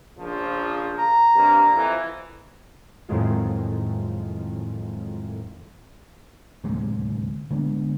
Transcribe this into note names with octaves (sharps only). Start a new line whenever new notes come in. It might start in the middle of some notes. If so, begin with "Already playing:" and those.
A#1 C#3 F3
A#5
G2 C3 A#3
F2 E3
F2 A2 D#3 F#3 G#3 F4
D1 D#2 C3 G#3
D3 G#3 A3 B3